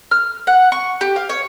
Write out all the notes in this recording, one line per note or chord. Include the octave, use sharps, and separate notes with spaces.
F6
F#5
C#6
G4
F5
C#5